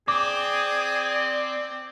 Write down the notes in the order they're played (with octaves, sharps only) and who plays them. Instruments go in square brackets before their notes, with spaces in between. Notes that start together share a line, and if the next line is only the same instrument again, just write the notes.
[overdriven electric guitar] C4 [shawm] G#4 [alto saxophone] D5 [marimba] D6